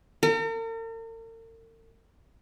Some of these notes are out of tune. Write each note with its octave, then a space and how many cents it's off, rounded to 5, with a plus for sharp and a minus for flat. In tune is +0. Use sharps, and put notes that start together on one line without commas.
A#4 -45